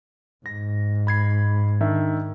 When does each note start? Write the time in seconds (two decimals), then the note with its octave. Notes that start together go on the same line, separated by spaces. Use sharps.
0.46 G#2 A#6
1.07 B5 G#6 C7
1.81 D#3 D4 E5